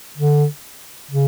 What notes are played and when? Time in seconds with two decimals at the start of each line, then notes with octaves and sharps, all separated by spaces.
0.18 D3
1.11 C#3